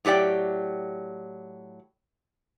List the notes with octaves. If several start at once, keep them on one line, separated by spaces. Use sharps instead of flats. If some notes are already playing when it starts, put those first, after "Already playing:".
A2 F#3 G4 D5 G5